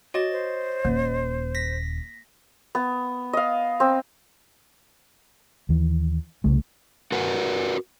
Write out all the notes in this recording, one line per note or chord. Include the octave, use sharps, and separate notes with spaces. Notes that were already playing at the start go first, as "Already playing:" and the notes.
F#4 C#5 D#5 A6
C5
D#1 A#3
A#6 B6
B3
D#5 F5
C4
D#2 E3
C2 C#3 A3
F#4 A#4 B4 F#5